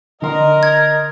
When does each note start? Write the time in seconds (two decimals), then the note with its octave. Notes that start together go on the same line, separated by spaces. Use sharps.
0.22 D3 A#4 D#5 C6
0.63 G#6